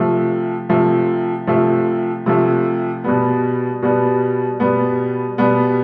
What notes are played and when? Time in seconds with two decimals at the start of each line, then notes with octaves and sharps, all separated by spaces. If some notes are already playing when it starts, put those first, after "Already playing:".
Already playing: C3 F3 A3
0.69 C3 F3 A3
1.47 C3 F3 A3
2.26 C3 F3 A3
3.04 B2 G3 B3
3.82 B2 G3 B3
4.60 B2 G3 B3
5.38 B2 G3 B3